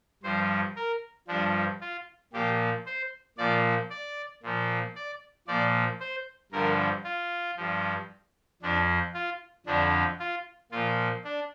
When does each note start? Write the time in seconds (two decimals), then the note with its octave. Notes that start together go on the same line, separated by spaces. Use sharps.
0.23 G2 F3 C5
0.76 A#4
1.28 G2 F3 D4
1.81 F4
2.33 A#2 F3 G4
2.86 C5
3.38 A#2 F3 D5
3.90 D5
4.43 A#2 F3
4.95 D5
5.47 A#2 F3 D5
6.00 C5
6.52 G2 D3 F3 A#4
7.04 F4
7.57 G2 F3
8.62 F2 F3 D4
9.14 F4
9.66 F2 D3 F3 D4
10.20 F4
10.72 A#2 F3 F4
11.24 D4